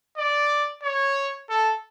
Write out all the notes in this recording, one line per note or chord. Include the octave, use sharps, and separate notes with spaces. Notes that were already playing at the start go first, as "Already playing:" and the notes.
D5
C#5
A4